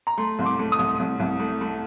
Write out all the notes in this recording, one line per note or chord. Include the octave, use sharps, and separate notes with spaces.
A#5
A3 C6
C2 C6
D6
A3
D#6
C2
C2
C2
A3
A3